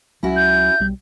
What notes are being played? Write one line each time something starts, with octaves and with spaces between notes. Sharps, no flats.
C#2 F#3 C#4 E4 F#4
G6
B1 G3